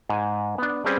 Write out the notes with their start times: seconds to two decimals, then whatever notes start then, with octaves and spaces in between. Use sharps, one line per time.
0.09 G#2 G#5
0.58 B3 D4
0.85 G3 C4 C#4 G#4 B4 D5